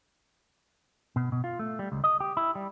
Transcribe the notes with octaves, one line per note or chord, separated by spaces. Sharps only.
B2
B2
F4
A3
G3
C#2
D#5
G4
E4
G3